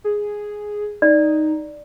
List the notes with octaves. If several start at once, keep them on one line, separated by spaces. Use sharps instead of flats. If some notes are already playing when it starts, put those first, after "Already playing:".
G#4
D#4 D5